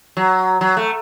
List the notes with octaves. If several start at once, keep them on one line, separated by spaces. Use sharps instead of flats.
F#3
F#3
A3